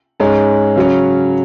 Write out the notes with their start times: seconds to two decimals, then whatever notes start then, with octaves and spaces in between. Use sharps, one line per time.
0.20 G#2 G#3 C#4
0.76 C#3 F#3 C#4